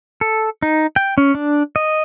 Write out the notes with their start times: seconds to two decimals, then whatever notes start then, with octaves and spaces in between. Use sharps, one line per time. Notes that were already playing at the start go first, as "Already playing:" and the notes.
0.21 A4
0.62 D#4
0.96 G5
1.18 C#4
1.35 D4
1.76 D#5